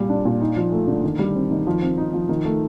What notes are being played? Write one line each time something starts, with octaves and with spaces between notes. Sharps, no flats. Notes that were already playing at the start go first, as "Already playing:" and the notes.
Already playing: A#2 G3
D4
A#2
D#4
F3
A3
D3
D#3
G3
C4
D#3
F3
C4
D#4
F3
D#3
A3